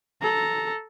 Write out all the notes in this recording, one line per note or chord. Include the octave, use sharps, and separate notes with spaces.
A4 A#5